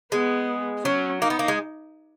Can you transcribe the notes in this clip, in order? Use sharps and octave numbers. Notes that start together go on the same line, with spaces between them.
G#3 B3
F#3 C#4
A#3 D#4
B3
A#3
G#3